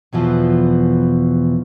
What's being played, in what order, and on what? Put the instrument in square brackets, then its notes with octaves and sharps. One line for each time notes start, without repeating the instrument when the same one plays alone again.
[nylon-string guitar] E2 B2 E3 F3